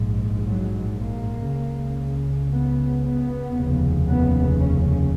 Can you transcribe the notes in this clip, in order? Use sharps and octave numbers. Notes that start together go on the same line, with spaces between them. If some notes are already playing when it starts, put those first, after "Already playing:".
Already playing: A#1 G#2
F#3
A#3
C#2 C#3
B3
B3
F1 D#2 C#3
B3
C#4